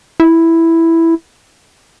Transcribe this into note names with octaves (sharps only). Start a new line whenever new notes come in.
E4